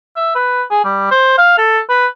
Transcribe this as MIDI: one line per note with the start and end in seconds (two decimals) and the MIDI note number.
0.16 0.34 76
0.35 0.63 71
0.71 0.80 68
0.84 1.09 55
1.11 1.34 72
1.38 1.54 77
1.58 1.79 69
1.90 2.07 71